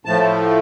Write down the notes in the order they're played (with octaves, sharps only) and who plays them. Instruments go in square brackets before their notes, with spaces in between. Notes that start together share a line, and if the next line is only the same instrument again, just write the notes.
[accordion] A2 F3 A3 A5